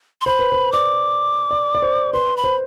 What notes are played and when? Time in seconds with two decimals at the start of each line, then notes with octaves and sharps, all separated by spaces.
0.21 C6
0.26 C5 B5
0.39 B4
0.52 C5
0.72 D5 D6
1.51 D5
1.75 D5
1.82 C5
2.13 B4 C6
2.37 B5
2.44 C5